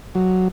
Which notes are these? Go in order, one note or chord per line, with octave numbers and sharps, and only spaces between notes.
F#3